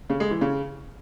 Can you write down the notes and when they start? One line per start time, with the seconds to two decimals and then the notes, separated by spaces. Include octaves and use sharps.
0.10 C#3
0.20 G#3
0.31 E3
0.41 C#3